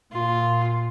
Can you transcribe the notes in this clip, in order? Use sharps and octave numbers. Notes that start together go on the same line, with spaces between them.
A#2 F4